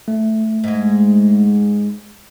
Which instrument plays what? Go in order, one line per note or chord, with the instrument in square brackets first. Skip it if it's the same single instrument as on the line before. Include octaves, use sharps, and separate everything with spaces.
[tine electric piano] A3
[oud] G#2 G#3